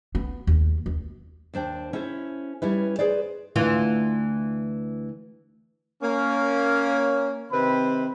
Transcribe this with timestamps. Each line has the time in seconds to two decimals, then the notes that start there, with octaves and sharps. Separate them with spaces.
0.15 B3
0.47 D#2
0.86 D#2
1.54 D#2 D4 C5 G5
1.93 C#4 E4 A4 C5
2.62 G3 C#4 E4 B4
2.99 G#4 B4 C5 D5
3.56 D2 E3 F4
6.03 A#3 C#4
7.52 C3 D#3 C4 B4 B5